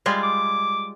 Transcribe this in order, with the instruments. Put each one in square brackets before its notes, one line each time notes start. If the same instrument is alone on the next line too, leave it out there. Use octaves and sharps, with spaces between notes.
[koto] G3 G#3 F4
[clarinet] D6